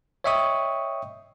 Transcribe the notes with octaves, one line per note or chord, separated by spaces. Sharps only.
C#5 D#5 E5 G5 C#6 D#6